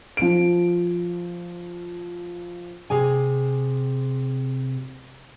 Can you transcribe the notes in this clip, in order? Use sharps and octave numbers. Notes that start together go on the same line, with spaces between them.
F3 D7
C3 G#4 G#5